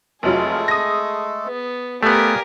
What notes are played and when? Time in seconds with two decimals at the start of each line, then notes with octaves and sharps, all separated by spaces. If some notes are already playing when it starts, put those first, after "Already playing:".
0.23 F1 F#3 G#3 A3 F4 G#4 A4
0.68 D#6 A#6
1.45 B3
2.03 A3 B3 G4 A#4 D5 F5 G#5